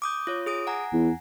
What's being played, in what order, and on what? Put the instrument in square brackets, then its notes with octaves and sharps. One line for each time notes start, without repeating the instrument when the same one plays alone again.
[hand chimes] D6 D#6 G6
F4 C#5
G#4 D#6 D7
F#5 G#5 A#5
[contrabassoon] E2